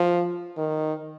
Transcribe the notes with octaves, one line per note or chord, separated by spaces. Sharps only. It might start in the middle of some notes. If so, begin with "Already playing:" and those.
Already playing: F3
D#3